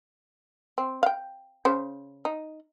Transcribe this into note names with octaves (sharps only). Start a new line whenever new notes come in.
C4
F5 G5
C#3 C5
D#4